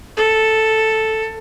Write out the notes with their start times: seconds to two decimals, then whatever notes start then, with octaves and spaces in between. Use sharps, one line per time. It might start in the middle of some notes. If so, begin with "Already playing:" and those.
0.17 A4